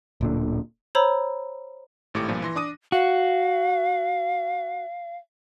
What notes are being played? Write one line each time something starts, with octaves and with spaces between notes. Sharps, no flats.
D1 A#2 D3
C5 C#5 A#5 B5 E6
G#1 A2 G4 D6 C#7
G2 A#2 F3
E3 C6 A#6
D4 D6 D#6 D#7
F#4 F5